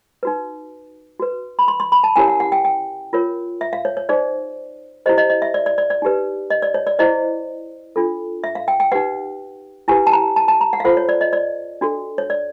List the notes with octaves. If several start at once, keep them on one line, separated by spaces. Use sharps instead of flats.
D#4 F#4 B4
F#4 B4
B5
C6
C6
B5
A5
C#4 E4 G4 A#4 C#5 G#5
F#5
F#5
G5
G5
F4 A#4 C#5
E5
F5
C#5
C#5
D#4 G#4 C5 D5
E4 G4 C5 D#5
D#5
D#5
E5
D5
D5
D5
D5
D#4 G4 B4
D#5
D5
C#5
D5
E4 G#4 C5 D#5
D4 F4 A4
E5
F5
G5
G5
D#4 G4 B4 F#5
E4 G4 B4 G#5
A5
A#5
A5
A5
A#5
F#5
F5
F4 A4 C5 F#5
C#5
D5
D#5
D5
D4 F#4 A4
C#5
D5